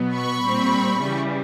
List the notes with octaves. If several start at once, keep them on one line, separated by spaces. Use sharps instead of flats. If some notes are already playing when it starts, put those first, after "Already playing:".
Already playing: B2 F#3 B3
B5 C#6
A#2 G3 C4
C#3 E3 G3